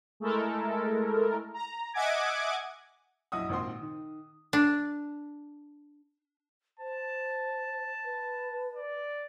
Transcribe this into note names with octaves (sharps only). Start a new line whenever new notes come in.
G#3 A3 E4 A4 A#4
A#5
D#5 E5 F#5 G#5 D6 G#6
A#1 F#2 E4 D#5 F#5 D#6
G#1 A#2 C4 F#4 F#5 C6
D#3
D4
C5 A5
B4
D5